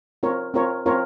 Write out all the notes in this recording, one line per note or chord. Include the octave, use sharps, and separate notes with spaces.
C4 F4 A#4 C#5
C4 F4 A#4 C#5
C4 F4 A#4 C#5